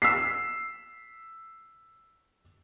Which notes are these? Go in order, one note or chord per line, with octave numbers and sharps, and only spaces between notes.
E6 B6 C7